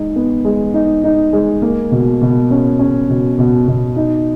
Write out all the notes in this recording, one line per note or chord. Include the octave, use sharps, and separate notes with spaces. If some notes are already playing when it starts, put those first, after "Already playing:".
Already playing: G#3 D#4
B3
G#3
D#4
D#4
G#3
A#3
B2
B2
C#4
C#4
B2
B2
B2
D#4